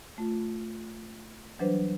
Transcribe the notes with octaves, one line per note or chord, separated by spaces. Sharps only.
A3 F4
E3 F#3 G3 D4 B4 C5